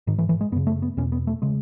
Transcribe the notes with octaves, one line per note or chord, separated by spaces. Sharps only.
G#2 D#3
E3
E3
G#3
F#2 C#3 B3
A3
B3
E2 B2 C#4
B3
A3
C#3 G#3